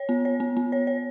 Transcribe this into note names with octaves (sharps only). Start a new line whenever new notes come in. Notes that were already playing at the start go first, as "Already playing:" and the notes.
Already playing: C#5
B3
C#5
B3
B3
C#5
C#5